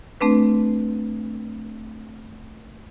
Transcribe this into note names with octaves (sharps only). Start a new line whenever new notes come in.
A3 C4 D4 B4